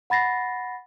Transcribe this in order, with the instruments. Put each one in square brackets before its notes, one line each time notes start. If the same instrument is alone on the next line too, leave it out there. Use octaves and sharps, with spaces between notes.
[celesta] F#5 B5 A6 A#6 C7